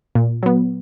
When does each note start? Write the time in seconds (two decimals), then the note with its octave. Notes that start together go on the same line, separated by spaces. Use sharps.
0.15 A#2
0.43 F#3 B3